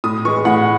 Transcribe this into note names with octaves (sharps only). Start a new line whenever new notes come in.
A2 D#6
E3 G#3 C#6
A2 F#5